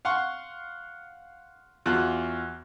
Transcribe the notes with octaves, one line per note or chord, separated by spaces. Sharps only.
F5 F#5 C6 C#6
E2 F4 F#4 F#6